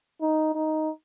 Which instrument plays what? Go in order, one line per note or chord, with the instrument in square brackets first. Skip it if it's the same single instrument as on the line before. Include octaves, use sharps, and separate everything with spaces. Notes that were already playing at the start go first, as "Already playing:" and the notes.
[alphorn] D#4
D#4